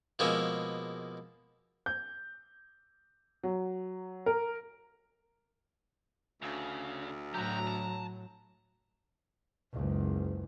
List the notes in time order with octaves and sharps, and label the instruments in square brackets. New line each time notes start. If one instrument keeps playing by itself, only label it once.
[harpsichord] B2 F3 G#3 A#3 C#4 E4
[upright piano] G6
F#3
A#4
[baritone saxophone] D2 [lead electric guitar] C#3
[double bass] A2 F#3 [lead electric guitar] F#4 G4 [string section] A#5
[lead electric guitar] A5
[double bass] F#1 C#2